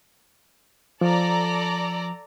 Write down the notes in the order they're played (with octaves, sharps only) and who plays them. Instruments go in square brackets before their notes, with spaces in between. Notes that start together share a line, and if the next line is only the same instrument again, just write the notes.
[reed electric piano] F3 [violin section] A4 D5 A#5